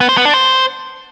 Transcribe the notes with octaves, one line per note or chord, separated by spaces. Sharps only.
B3
C5
B3
D4
C5